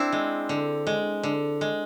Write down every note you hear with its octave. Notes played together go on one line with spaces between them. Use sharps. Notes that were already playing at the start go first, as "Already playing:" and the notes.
Already playing: C4 D4 E4
G#3
D3
G#3
D3
G#3